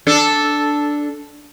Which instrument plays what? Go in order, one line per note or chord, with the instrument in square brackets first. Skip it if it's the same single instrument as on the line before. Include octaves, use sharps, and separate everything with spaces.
[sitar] D4 A4